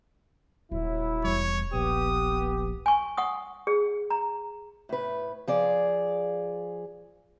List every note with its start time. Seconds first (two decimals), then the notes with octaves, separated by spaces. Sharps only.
0.72 D#1 F#3 E4
1.24 E2 G3 C#5
1.74 A#1 B3 G4 D#6
2.86 G#5 C#6
3.17 F#5 C#6 D#6
3.67 G#4
4.10 A#5
4.89 A2 B4
5.47 F3 G#4 D5